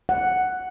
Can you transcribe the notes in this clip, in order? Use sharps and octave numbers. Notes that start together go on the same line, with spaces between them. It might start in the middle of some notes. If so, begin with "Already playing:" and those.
F#5